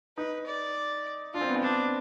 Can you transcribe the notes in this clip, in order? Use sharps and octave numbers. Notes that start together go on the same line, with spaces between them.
D#4 B4
D5
D4 F4
C4
B3
C4
D4